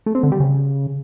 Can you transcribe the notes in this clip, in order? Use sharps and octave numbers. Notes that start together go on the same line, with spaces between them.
A3
C4
D3
G3
C#3